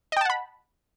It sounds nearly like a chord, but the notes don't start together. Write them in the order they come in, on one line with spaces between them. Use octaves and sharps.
D#5 G5 A5 F#5 B5